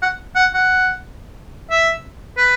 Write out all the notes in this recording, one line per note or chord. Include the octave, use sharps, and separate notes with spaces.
F#5
F#5
F#5
E5
B4